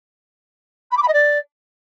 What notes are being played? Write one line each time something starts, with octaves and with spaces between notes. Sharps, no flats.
B5
D6
B5
D#5
D5